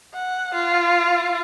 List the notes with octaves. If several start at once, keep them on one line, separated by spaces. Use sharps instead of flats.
F#5
F4